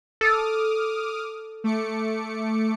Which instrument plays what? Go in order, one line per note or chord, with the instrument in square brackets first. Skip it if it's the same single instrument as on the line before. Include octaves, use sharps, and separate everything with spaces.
[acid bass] A4 [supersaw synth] D6 D#6 F6
[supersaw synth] A3 D6 C#7